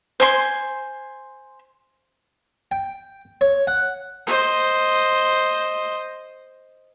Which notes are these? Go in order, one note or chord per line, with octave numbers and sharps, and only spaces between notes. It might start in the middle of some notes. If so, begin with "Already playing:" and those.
C5 G#5 C6
G5
C#5
F#5
C5 D#5